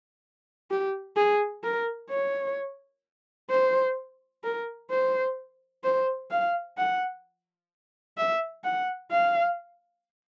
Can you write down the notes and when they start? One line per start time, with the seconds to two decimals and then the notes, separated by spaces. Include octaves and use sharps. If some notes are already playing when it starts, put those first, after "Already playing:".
0.70 G4
1.16 G#4
1.63 A#4
2.10 C#5
3.50 C5
4.44 A#4
4.90 C5
5.84 C5
6.31 F5
6.77 F#5
8.18 E5
8.64 F#5
9.11 F5